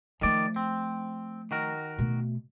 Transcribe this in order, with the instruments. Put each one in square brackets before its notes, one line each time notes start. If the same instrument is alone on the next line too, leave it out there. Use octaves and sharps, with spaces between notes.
[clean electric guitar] D#3 D5 [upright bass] F3 A3
[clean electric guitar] C4
D#3 F#4 A#4
[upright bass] B2 A3